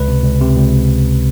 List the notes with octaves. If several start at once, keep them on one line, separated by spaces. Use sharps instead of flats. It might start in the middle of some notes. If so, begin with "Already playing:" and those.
Already playing: C#2 B4
C3
C#2
C3
C#2